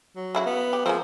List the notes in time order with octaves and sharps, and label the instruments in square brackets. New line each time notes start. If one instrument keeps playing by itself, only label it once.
[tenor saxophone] F#3
[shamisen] C#3 E4 F#4
[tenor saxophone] B3
[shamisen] G4
[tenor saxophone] F3 [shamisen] G#3 A#3 C4